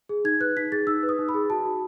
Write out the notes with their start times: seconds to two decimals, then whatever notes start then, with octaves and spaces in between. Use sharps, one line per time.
0.09 G#4
0.24 D#4 G#6
0.41 B4 F#6
0.57 D#4 B6
0.72 G#4 A6
0.87 D#4 E6
1.03 B4
1.09 D#6
1.19 D#4
1.29 B5
1.34 G#4
1.50 F#4 A5
1.65 F#4